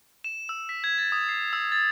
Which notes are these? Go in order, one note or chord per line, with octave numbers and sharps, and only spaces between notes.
E7
E6
B6
G#6
A6
D#6
C7
E6
A6